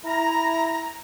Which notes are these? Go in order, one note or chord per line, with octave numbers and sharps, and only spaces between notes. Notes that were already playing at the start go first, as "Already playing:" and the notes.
E4 A#5